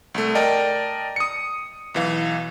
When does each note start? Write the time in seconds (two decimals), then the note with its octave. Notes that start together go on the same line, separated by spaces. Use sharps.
0.14 C2 A3
0.35 A#4 D5 D#5 G5 A5
1.16 D#6 C#7
1.95 B1 E3 F5